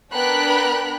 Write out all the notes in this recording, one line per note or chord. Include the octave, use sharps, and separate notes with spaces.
B3 D4 A#4 G5 B5 F#6